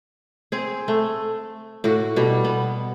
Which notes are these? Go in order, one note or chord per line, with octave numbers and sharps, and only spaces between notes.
C4 G#4
A3
A2 F#4
B2 G3
B3